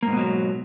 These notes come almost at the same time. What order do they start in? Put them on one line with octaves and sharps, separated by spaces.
A#3 G#2 B2 F#3